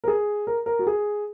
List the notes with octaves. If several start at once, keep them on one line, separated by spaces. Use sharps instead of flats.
A#4
G#4
A#4
A#4
F#4
G#4